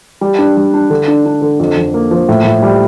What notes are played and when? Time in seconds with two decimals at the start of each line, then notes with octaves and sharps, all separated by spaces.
0.21 G3
0.38 D4
0.57 G3
0.74 D4
0.90 D3
1.08 D4
1.26 D4
1.42 D3
1.60 F2
1.77 F2
1.94 A#3
2.11 F3
2.29 A2
2.45 A2
2.63 G3